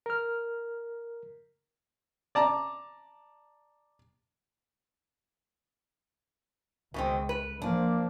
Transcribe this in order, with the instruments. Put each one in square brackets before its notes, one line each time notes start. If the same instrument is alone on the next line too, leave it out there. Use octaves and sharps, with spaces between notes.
[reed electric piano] A#4 F6
[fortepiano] D5 A5 A#5
[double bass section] C#2 [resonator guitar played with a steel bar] B2 D#3 C4
[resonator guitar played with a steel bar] B4
[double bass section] F3 [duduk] A#3 [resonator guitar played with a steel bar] D4